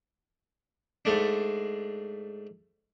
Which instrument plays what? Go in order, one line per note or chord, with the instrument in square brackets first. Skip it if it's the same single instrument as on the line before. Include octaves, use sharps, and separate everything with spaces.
[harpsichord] G#2 A3 D4